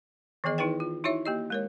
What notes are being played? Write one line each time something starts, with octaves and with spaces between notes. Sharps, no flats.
D#3 E3 B3 G#4 D#5
D#4 E4 G#4 B4 G5
F4
D#4 E4 F#4 C#5 E5
A#3 G4 D#5
G#3 A#4 C#5